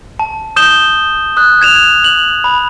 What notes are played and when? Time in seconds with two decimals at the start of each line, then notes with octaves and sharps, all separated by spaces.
0.19 A5
0.56 D#6 G6 E7 G7
1.37 D#6 F#6
1.61 G#6 E7 F7
2.04 F#7
2.44 B5